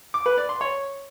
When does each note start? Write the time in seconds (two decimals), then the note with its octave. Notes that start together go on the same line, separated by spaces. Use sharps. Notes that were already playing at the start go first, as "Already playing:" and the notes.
0.14 D6
0.26 B4
0.37 D5
0.49 C6
0.61 C#5